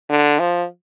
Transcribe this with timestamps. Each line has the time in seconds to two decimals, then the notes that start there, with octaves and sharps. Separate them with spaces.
0.10 D3
0.39 F3